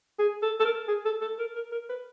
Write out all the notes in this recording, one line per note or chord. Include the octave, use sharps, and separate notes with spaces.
G#4
A4
A4
A#4
G#4
A4
A4
A#4
A#4
A#4
B4